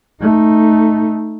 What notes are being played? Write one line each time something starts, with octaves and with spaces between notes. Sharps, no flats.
A3 D#4